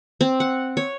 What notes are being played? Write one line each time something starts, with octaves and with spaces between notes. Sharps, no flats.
C4
F#5
C#5